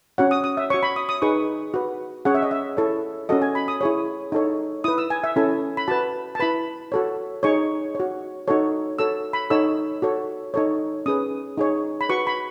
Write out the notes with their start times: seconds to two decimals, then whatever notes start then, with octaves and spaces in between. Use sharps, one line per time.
0.18 C#4 F#4 C#5 F#5
0.31 D#6
0.44 D#6
0.57 E5
0.70 F#4 C#5 C#6
0.83 B5
0.96 D#6
1.09 D#6
1.22 D#4 G#4 B4 C#6
1.74 F#4 B4
2.25 C#4 G#4 C#5 F#5
2.35 E5
2.42 D#5
2.51 E5
2.77 E4 A4 C#5
3.29 C#4 F#4 A4 D#5
3.42 G#5
3.55 B5
3.68 D#6
3.81 E4 G#4 C#5
4.32 D#4 A4 C#5
4.84 E4 B4 D#6
4.98 E6
5.10 G#5
5.24 E5
5.36 C#4 E4 A4 G#5
5.77 B5
5.88 F#4 B4 A5
6.35 A5
6.40 E4 B4 B5
6.92 F#4 A4 C#5
7.43 D#4 G#4 C#5 C#6
7.95 F#4 C#5
8.48 D#4 F#4 A4 C#5
8.99 F#4 A4 C#5 E6
9.33 B5
9.50 D#4 A4 C#5 E6
10.02 F#4 A4 C#5
10.54 D#4 A4 C#5
11.06 C#4 G#4 B4 D#6
11.57 D#4 G#4 C#5
12.01 B5
12.09 F#4 B4 C#6
12.27 B5